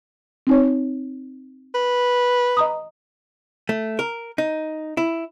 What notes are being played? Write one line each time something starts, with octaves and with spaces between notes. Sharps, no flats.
C4 D#4 C#5
B4
D#5 A#5 D#6
A3
A#4
D#4
E4